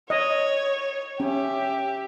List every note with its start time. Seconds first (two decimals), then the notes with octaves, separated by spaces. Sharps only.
0.10 C#5 D#5
1.20 C#4 G4 E5